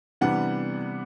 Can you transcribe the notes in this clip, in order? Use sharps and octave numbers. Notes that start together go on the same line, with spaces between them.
C3 E3 G3 B3 D4 F#5